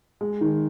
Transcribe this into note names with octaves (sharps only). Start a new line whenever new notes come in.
G#3
D#3